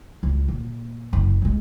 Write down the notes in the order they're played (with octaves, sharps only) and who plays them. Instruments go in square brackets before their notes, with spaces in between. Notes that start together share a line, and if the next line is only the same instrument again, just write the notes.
[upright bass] C#2
A#2
F#1
C#2 G#3